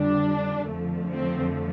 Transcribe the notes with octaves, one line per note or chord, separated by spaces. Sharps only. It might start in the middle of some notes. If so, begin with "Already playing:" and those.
Already playing: F2 D3 G3 D4
F2 D3 F3 A3
C4